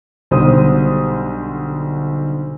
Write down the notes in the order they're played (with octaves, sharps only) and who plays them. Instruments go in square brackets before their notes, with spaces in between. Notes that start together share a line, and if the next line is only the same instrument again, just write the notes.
[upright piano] B1 D3 G3 C5 D#6